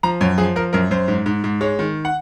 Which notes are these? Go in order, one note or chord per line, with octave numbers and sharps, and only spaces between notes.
F3 A#5
F#2 C#5
F3 G#4
F3 A#4
F#2 A#4
F#2 C5
G#2
G#2
G#2
G#3 C#5
D#3
F#5